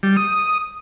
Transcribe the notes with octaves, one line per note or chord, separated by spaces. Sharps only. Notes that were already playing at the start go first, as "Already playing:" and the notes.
G3
D#6